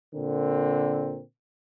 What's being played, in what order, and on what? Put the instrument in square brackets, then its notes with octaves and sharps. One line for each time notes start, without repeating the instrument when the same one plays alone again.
[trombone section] A#2 D3 C4 A#4